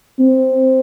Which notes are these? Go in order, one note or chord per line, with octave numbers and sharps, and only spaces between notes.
C4